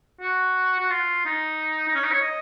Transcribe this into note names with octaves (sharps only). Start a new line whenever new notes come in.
F#4
F#4
F4
D#4
D#4
C#4
D#4
C#5
D#5